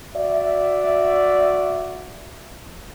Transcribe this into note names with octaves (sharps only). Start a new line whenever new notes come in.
F#4 D5 E5